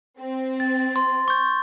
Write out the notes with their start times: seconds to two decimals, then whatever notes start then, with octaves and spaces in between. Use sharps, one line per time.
0.19 C4
0.60 A6
0.96 C6
1.28 C#6 G6